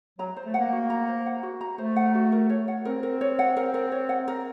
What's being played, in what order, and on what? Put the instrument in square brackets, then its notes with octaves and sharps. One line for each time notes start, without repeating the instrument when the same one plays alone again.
[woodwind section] F#3 [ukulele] A#5
[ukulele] C5
[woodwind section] A3
[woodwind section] A#3 [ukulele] F#5
[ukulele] F#4
A#5
C5
F#5
F#4
A#5
[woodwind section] A3 [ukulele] C5
[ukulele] F#5
F#4
A#4
C#5
F#5
[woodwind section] C4 [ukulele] A#4
[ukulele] A#4
C#5
F#5
A#4
A#4
C#5
F#5
A#4